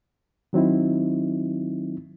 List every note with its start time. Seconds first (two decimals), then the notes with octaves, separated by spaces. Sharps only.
0.53 D#3 F#3 C4 D#4 E4